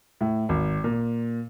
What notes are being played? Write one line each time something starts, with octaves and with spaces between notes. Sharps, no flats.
A2
G#1
A#2